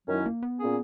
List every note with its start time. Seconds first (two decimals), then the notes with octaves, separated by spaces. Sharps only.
0.08 F#2 D#3 F#3 C#4 E4
0.26 A#3
0.43 B3
0.60 A#2 A#3 C#4 G#4